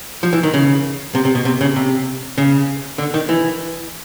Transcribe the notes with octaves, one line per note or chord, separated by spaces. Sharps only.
F3
E3
D#3
C#3
C3
C3
B2
C3
C#3
C3
C#3
D3
D#3
E3